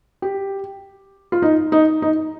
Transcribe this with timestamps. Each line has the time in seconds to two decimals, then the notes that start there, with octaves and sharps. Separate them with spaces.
0.22 G4
1.32 F4
1.42 D#4
1.72 D#4
2.02 D#4